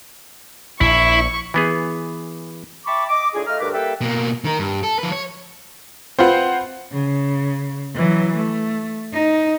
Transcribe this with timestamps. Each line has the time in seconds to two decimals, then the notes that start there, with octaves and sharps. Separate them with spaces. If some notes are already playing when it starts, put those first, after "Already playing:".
0.81 A#1 E4 C#6
1.54 E3 B3 G#4
2.86 E5 G5 A5 B5 C#6 D6
3.09 D#5 D6
3.34 A2 D4 F4 G#4
3.47 A3 F4 D#5 A#5 F6
3.60 D2 G2 A#4 B4 D6
3.73 G3 A#3 A4 B4 E5 G5
4.01 B2 A#3
4.44 D#3 A#4
4.59 G2
4.83 A4
4.99 F3 B4
5.12 C#5
6.19 C4 F4 B4 C5 F#5
6.93 C#3
7.95 E3 F#3
8.37 A3
9.13 D#4